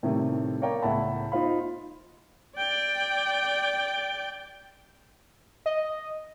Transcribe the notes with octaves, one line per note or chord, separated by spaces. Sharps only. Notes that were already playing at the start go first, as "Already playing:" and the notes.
A2 C3 D#3 G3 A3
A#4 C#5 D5 F5 G5 A#5
C#2 A2 E5 F#5 A5 B5
D#4 F4 C5 F5 B5
D5 G5
D#5